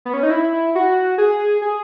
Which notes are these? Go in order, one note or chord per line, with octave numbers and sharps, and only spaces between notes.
B3
C#4
D#4
E4
F#4
G#4
G#4